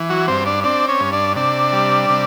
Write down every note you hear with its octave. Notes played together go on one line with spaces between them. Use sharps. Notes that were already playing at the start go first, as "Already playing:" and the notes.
Already playing: E3
F#3 F#4
G2 C4 C5
D4 D5
C4 D4 D5
C#4 C#5
G2
D4 D5
C3 D4 D5
G3
C3